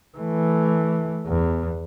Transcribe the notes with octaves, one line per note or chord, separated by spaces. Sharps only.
E3 A3
E2